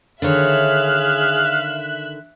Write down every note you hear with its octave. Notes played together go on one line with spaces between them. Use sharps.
D3 D#3 G#4 C#5 E5 F5 F#6